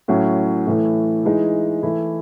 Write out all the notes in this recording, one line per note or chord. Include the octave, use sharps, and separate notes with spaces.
A2 F#3 C#4
A2 E3 A3
E3 G#3 D#4
E3 A3 E4